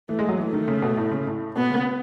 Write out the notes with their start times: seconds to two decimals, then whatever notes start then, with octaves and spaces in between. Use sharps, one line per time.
0.09 E3 A3
0.19 G#3
0.29 F#3
0.38 E3 A3
0.53 D#3
0.68 C#3
0.82 B2
0.97 A2
1.12 C#3
1.27 A2
1.56 B2 B3
1.70 C#3